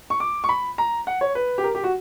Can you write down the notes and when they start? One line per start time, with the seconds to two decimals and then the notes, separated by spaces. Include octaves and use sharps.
0.10 C#6
0.20 D6
0.44 C#6
0.49 B5
0.78 A#5
1.07 F#5
1.21 C#5
1.35 B4
1.58 G4
1.64 A#4
1.75 G4
1.84 F#4